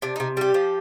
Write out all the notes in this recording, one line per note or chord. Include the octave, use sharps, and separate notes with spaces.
C3 D4
C3 D#4
G3 G4
F3